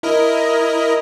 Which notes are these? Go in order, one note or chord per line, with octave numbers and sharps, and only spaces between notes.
E4 A#4 D#5